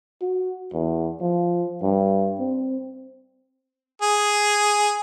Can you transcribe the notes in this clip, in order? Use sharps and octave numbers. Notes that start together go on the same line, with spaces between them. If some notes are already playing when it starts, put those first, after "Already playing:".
F#4
E2
F3
G2
C4
G#4